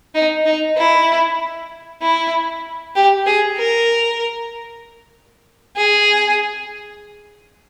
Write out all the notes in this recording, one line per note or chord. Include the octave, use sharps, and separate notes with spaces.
D#4
D#4
E4
E4
G4
G#4
A#4
G#4